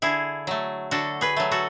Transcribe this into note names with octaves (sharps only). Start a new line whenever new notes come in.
D3 E4 G#4
F#3 A3
D3 F#4 A4
G#4 B4
F#3 A3
F#4 A4